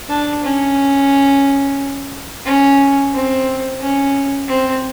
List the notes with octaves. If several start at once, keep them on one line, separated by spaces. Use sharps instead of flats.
D4
C#4
C#4
C4
C#4
C4